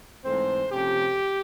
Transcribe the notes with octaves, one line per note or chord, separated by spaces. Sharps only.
G#2 E3 A3 C4 C5
C3 F3 A3 C#4 G4